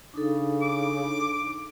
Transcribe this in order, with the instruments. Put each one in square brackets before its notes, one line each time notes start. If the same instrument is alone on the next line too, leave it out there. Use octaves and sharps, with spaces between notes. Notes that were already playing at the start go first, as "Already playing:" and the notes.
[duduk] C#3 [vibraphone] D4 D#4 A4
[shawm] D6